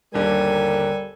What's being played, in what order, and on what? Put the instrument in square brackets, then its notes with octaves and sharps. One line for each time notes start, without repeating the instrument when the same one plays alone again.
[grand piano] G1 D#2 D3 [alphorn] G3 [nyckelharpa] A4 G#5 [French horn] A#4